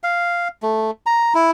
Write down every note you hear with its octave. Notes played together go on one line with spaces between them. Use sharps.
F5
A3
A#5
E4